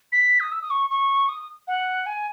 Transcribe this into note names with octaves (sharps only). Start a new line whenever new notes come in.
B6
D#6
E6
D#6
C#6
C#6
D#6
F#5
G#5